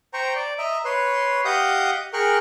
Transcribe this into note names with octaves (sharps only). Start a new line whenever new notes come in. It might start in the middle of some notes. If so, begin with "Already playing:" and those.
C5 G5 A#5 C#6
D5
D#5 E5 A#5
B4 C#5 C6
G4 D#5 F5 F#5 D#6 G6
G#4 A#4 G5 C#6 F6 F#6